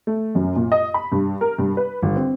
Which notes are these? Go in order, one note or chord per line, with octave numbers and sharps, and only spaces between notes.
A3
F#2
A#2
D#5
B5
G2
A#4
G2
B4
G1
C4